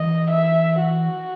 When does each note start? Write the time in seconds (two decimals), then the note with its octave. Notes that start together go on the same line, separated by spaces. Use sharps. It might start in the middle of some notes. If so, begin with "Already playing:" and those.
Already playing: E3 D#5
0.31 E5
0.79 F#4